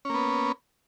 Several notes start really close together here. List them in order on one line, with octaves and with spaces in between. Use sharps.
C#4 A#3 B3